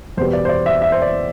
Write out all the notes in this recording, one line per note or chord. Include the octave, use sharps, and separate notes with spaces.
E2 B2 G3 C5
D5
C5
D5
E5
E5
C5
D5